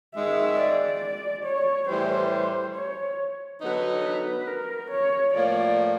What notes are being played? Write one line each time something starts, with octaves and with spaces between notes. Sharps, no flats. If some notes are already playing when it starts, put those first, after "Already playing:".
G#2 D#3 G#3 E5
D5
C#5
A2 E3 G3 C5
C#5
D3 F#3 B3 D#4 B4
B4
A#4
C#5
A2 F3 A#3 D5